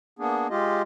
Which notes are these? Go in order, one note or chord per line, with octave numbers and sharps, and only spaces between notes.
A#3 B3 D4 G#4
G#3 F4 G4 D#5